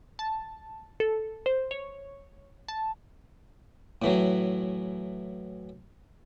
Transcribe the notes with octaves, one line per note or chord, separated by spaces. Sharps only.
A5
A4
C5
C#5
A5
A2 E3 F#3